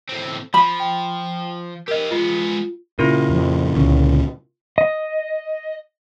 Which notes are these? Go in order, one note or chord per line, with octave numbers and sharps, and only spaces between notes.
A2 C4
F3 B5
G5
G4 A#4 D#5 F5
G#3 B3 F4
A#2 C#3 E4 F4 A#4
F2
C#2 A#2 D3 C#4
D#5